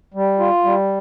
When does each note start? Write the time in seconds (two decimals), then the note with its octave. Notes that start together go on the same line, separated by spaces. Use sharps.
0.14 G3
0.39 F4
0.64 G3